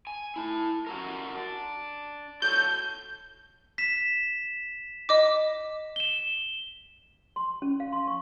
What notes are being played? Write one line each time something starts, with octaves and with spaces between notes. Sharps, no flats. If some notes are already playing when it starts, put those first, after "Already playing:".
G#5
E4 A5
F#4 G4 A#4
D4
F#4 A4 C#5 G6
B6 E7
D#5 D6
E7 G7
C6
C#4
F5
C6
C#6